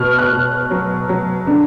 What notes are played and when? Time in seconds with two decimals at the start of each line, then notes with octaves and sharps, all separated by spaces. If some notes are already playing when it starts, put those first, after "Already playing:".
Already playing: B2 F6
0.19 F#6
0.32 B2
0.71 F#3
1.09 F#3
1.47 D3